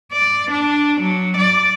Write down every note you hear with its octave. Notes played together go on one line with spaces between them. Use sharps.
D5
D4
F#3
D5